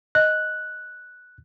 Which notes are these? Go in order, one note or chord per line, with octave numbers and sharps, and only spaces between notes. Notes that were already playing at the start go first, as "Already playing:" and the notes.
D#5 F#6